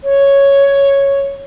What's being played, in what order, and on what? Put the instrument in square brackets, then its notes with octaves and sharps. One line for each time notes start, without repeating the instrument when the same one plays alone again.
[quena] C#5